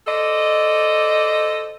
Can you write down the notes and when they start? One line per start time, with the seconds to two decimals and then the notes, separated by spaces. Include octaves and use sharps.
0.07 A4 C5 D5 D#5